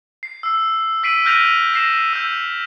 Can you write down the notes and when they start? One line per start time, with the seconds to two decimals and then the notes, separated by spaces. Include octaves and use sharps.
0.23 C7
0.43 E6 C7
1.03 E6 B6 C7 D7 D#7 F#7
1.25 E6 F6 G6 A#6 D#7 F7
1.74 A#6 C7 E7
2.13 E6 G6